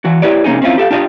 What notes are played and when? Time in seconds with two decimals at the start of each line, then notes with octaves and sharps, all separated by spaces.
0.05 E3 F#4
0.22 E4 G4 B4 C#5 D5
0.44 C3 A#3 C#4 D#4 G#4
0.62 C4 C#4 E4 F4
0.78 G4 A4 F5
0.91 D4 F4 G4 D5 D#5